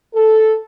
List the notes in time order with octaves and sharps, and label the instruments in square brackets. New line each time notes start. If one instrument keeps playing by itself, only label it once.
[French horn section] A4